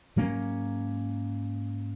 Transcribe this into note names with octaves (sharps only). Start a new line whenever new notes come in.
G#2 F#3 A#3 C#4